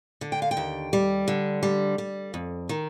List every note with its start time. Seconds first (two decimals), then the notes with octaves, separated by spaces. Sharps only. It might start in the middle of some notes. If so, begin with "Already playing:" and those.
0.21 D3
0.32 G5
0.42 F5
0.51 G5
0.57 D#2
0.93 G3
1.28 D3
1.63 G3
1.98 G3
2.34 F2
2.69 D#3